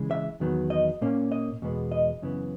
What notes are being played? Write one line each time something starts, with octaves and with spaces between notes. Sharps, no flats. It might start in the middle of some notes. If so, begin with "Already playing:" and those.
Already playing: C#3 E3 G#3
E5
E2 D#3 F#3 B3
D#5
A#2 A#3 C#4
D#5
E2 B2 G#3 B3
D#5
F#2 C#3 E3 B3